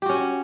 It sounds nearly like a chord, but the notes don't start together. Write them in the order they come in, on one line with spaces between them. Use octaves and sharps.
G4 F#4 C#4